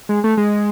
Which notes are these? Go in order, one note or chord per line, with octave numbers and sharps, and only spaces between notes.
G#3
A3
G#3